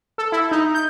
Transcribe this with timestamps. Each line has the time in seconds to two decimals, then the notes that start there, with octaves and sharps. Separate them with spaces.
0.18 A4
0.32 E4
0.51 D#4
0.75 G6